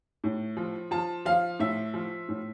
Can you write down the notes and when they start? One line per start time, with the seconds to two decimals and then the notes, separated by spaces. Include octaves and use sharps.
0.24 A2
0.57 F3
0.91 F3 A5
1.25 F3 F5
1.59 A2 E5
1.94 F3
2.29 A2